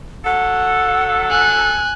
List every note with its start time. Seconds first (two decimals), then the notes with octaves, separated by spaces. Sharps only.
0.25 F#3 A4 F#5
1.30 G#5 F#6